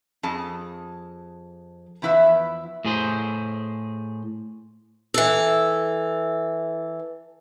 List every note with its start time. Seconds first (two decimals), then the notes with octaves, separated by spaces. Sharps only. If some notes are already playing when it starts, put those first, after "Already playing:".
0.23 F2 G#4 D#5 A5
2.02 E2 F3 E4 B4 E5
2.85 A2 G#4 C5
5.14 E3 A4